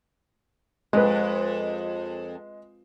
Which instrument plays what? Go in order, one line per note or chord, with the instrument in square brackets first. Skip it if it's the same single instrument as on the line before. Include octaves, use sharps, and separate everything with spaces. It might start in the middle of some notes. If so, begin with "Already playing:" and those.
[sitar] F2 [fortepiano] G#3 B4